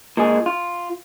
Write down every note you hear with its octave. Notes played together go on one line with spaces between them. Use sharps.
A#2 G#3 G#4
F4